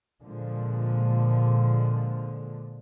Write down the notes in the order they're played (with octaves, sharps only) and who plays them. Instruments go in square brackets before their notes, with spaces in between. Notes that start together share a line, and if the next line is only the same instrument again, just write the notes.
[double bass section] A#2 D3 F3 G#3